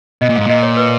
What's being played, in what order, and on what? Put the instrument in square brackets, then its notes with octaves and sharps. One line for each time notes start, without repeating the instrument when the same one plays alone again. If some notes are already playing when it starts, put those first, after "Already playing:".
[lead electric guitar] B2 [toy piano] D#5
[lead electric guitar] A#2
[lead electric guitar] G#2 [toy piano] F5
[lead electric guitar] A#2 [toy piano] D#5
[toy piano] C#5
B4